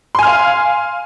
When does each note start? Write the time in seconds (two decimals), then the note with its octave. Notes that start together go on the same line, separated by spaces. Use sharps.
0.15 C6
0.19 G#5
0.23 F6
0.27 F5